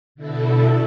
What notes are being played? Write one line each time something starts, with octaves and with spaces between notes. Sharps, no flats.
B2 D3 E4 A4